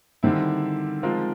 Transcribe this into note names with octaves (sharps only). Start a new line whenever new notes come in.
D3 D#3 G3 C4 E4
F3 G#3 C4 F4 A#4